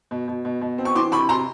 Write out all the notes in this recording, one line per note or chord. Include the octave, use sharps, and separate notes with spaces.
B2
B2
B2
B2
C4
C#6
E3 C6 D6
C3 B5 C#6
C3 A#5 C6